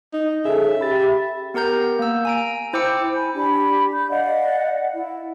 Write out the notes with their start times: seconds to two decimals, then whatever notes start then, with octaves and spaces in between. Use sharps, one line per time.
0.13 D#4
0.45 C#3 G#4 A4 E5
0.81 G4 B5 A6
1.54 B3 G4 A#4 A#5 G6
1.99 A#3 E6
2.25 G#5 A#5 D7
2.73 E4 C5 G5 D6 E6 C#7
3.15 G#5 B5
3.35 D4 G4 B5
3.94 G6
4.09 D5 D#5 F5 F#5
4.94 E4